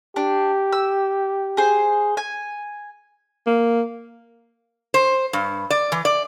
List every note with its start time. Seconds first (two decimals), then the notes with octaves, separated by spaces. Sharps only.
0.16 D4 G4
0.73 E6
1.57 G#4 C5
2.17 G#5
3.47 A#3
4.94 C5
5.33 G2
5.70 D5
5.92 E3
6.05 D5